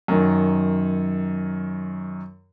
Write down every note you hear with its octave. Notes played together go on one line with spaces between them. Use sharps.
F#2 D#3